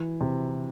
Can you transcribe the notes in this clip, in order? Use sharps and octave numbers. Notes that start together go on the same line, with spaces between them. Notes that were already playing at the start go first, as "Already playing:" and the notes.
Already playing: E3
C3